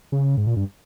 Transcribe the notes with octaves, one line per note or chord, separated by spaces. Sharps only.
C#3
G#2
A#2
G2